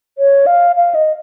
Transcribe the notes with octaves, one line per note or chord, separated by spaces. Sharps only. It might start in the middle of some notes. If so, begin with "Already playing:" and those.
C#5
F5
F5
D#5